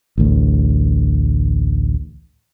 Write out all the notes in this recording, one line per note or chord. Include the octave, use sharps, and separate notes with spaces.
A1 D2